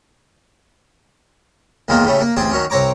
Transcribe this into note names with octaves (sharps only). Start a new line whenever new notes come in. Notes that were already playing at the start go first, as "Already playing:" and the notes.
B1 E2 D#3 G#3 A#3 F4
A2 C#3 G3 A3
A#3
A1 D2 C4 G#4 D5
D#3 F#3 C#4
C2 C4 C#5 A#5 D6